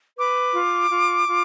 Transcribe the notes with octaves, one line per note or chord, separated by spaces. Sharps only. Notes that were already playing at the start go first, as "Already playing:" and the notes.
B4 D6
F4
F4
F4